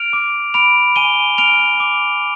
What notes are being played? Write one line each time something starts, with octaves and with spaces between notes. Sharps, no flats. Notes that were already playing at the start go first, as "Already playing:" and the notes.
Already playing: F6 D7 F7
D6
B5 D7 F7
G#5 D#7 G7
F6 D7 F7
D6